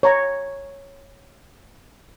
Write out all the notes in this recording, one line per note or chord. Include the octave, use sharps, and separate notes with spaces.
C#5 A#5 C#6